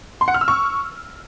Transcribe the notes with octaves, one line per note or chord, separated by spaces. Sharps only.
C6
F#5
F6
E6
C#6